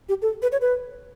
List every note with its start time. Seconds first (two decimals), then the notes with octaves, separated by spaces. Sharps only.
0.09 G4
0.22 A4
0.42 B4
0.52 C#5
0.62 B4